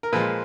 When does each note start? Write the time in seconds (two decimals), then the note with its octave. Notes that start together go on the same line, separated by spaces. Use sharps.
0.03 A#4
0.13 A#2 F3 G#3 B4